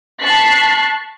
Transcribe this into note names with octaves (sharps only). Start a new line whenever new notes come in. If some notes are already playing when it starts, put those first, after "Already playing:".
A5 C#6 F#6 B6 C7